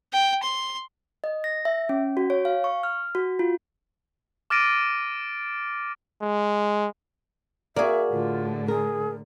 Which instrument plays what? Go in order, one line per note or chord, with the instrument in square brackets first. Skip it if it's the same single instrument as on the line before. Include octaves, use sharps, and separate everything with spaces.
[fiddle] G5
C6
[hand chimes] D#5
A#6
E5
C#4
F#4
C#5
F5
C#6
F6
F#4
F4
[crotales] D6 F6 A6 A#6 D7 D#7
[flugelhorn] G#3
[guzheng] A#3 G#4 [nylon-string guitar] F#4 D5 [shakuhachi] E5
[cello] A2 D3 [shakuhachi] F4
[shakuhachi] G#4 [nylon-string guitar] A#4